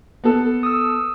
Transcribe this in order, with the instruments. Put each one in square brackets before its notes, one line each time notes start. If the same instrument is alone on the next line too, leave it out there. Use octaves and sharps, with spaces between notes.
[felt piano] B3 A4
[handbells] D#6 E6